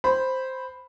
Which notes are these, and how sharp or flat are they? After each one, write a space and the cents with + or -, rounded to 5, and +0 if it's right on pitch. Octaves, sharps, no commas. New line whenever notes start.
C5 +0 B5 +0